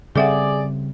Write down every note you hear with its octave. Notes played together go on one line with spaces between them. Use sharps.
C#3 G3 C4 G#4 A4 D5 E5 F#5